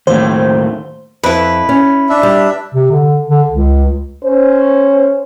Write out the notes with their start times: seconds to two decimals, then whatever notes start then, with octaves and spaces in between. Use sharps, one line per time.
0.07 D#2 A2 C5
1.23 F2 E4 B4
1.69 C#4
2.10 D4 E5
2.23 G3
2.75 C3
2.91 D3
3.30 D3
3.49 C#2
4.24 C#4 C5